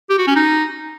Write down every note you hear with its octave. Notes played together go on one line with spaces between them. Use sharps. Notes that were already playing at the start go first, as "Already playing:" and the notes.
G4
F#4
C#4
D#4